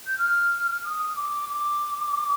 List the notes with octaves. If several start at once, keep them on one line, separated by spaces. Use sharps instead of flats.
G6
F6
D#6
D6
D6